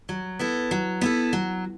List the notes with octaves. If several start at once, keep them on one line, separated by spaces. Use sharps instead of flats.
F#3
B3 E4 A4
F#3
B3 E4 A4
F#3